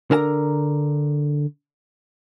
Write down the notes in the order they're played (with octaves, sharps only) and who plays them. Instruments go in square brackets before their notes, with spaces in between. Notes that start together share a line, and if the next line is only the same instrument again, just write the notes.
[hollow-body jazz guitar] D3 A#4 A5 A#5